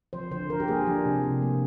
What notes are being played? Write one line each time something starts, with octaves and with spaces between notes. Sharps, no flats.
F3 C5
D3 C5
D3 A#4
G4
A#3 G#4
F3 D4
C3
C3
A#3